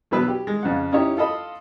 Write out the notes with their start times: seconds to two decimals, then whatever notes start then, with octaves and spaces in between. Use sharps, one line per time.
0.11 E2 B2 F#3 B3 B4 E6
0.28 G4
0.47 G#3
0.63 F2 C#3 F#5
0.92 C#4 D#4 E4 G4 C#5
1.17 F4 A4 D#5 B5